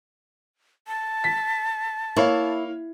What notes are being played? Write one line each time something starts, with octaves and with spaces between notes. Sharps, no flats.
A5
B6
A#3 E4 C#5 F5